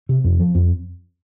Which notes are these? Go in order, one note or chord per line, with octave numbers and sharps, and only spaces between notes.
C3
F2
F3
F2